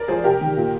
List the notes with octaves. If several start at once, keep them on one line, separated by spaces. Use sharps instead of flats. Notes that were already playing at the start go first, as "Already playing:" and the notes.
Already playing: A#4 D5
F3 G#4 C5
C3 G4 A#4
D#3
A#2